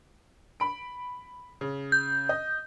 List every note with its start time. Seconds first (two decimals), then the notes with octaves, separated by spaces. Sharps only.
0.60 B5 D7
1.61 C#3
1.92 G6
2.29 D#5